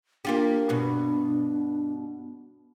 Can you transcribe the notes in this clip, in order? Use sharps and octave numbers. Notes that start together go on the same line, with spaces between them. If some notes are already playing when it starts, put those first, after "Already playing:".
A#3 D4 F4 G4
G2 B2